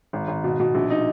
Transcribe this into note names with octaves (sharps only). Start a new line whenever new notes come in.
G#1
G#1
B2
B2
A#1
D#4